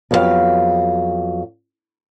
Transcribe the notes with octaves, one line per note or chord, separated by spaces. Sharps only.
F2 F#3 B3 F#4 G4 F5